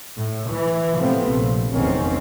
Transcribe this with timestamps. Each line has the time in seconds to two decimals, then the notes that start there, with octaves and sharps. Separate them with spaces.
0.17 A2
0.50 E3
0.96 A2 C3 F3 A3 B3 C4
1.30 A#1 F3
1.72 F1 B1 E2 D#3 C4 C#4